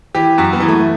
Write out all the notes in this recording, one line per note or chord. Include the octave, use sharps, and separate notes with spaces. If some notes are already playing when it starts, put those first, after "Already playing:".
E3 G4
F#2 F#4
B3
E3
A3